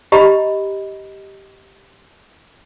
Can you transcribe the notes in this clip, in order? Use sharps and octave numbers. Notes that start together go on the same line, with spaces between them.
G4 D#5 A#5 B5